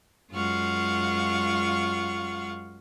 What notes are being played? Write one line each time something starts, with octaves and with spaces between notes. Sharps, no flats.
F#2 G#3 F4 F5 F#5 C#6